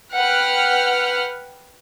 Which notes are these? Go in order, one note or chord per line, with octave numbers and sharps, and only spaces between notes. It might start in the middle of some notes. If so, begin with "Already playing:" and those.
B4 F#5 G5 F6